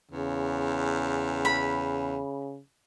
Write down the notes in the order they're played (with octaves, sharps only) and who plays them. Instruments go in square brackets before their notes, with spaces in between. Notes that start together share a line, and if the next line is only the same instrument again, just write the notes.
[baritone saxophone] E2 [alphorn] C#3
[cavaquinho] B5